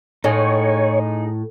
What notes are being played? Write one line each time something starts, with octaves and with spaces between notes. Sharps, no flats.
A2 D#4 G#4 C#5